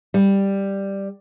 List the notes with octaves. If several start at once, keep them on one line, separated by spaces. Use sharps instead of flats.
G3